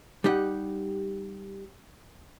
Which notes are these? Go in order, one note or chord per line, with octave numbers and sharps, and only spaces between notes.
G3 D#4 G4 F#5